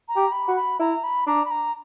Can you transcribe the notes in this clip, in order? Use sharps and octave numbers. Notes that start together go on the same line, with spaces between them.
A#5
G4
B5
F#4
B5
E4 A#5
B5
D4 A#5
B5
A#5